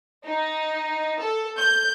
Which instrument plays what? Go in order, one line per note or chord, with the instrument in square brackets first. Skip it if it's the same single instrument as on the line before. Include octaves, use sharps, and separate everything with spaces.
[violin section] D#4
A4
G6